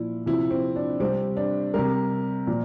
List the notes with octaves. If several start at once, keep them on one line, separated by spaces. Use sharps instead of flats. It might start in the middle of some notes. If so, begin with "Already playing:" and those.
Already playing: A#2 F3 E4
C3 F3 E4
C4
D4
C3 G3 C4
D4
C3 G3 A#4
A#2 F3